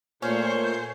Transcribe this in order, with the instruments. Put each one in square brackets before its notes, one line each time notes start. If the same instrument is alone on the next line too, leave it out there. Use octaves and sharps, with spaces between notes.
[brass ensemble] A#2 [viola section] A3 C#5 [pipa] C#4 [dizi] C5